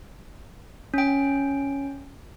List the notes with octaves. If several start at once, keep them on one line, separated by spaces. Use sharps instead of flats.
C#4 G5